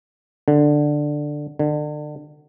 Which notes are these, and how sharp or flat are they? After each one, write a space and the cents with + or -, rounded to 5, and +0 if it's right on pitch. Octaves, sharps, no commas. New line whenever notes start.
D3 +10
D3 +35